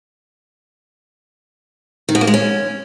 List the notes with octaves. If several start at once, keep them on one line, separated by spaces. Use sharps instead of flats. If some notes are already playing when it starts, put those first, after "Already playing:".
D#3
B2
A#3
G#3
C#4